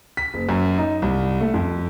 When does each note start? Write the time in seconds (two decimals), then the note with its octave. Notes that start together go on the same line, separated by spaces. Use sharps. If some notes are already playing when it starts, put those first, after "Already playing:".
0.17 B6
0.34 F#1
0.49 F#2
0.78 D#4
1.02 C2
1.40 A3
1.54 F2